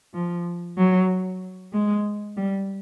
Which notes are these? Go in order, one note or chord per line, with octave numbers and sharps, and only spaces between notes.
F3
F#3
G#3
G3